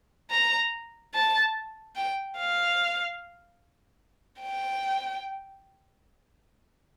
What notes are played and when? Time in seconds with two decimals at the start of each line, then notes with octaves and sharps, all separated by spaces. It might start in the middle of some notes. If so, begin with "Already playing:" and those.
0.31 A#5
1.14 A5
1.95 G5
2.37 F5
4.42 G5